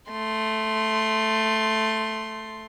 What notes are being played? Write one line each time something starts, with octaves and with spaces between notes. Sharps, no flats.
A3 C6